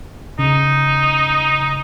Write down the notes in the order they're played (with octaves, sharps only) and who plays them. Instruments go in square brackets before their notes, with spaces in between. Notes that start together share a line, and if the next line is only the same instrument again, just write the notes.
[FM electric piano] C#3 [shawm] D#4